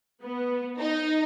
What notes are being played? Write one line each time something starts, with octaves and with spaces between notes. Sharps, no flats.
B3
D#4